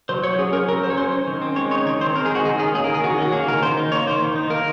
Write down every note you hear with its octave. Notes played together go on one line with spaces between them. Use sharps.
F#3 C5
F#3 C#5
C#4 G#4
C#4 A#4
F#3 A#4
F#3 C5
C#5
C#4 C5
C#4
D#3
C4
G#3 C#5
D#4 C#5
D#3 C#5
C4 C5
G#3 A#4
G#4
D#4 F#4
D#3 G#4
C#4 G#4
A#3 G#4
A#4
D#3
G#4
D#3 F#4
C#4 F#4
A#3 G#4
D#3 A#4
D#3 C5
D#4
A#3 C#5
D#3 C5
D#3
D#4
A#3 A#4